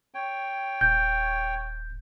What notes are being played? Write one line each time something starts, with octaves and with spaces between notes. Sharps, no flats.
C#5 G5
D#1 G6